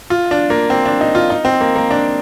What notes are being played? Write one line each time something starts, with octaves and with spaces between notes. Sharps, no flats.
F4
D4
A#3
C4
D4
D#4
F4
D#4
C4
A#3
A#3
D4